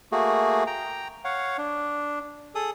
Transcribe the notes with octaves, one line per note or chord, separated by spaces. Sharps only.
A3 A#3 F#4 G#4
G5 A#5
C#5 F5 F#5
D4
G#4 A4 D#6